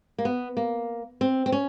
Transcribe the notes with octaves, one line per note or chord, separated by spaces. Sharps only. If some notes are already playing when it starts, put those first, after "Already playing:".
A#3
B3
A#3
C4
C4
C#4